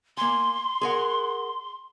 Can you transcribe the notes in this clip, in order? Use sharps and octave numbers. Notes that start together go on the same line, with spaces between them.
A#3 G#5 C6
G#4 A#4 F#5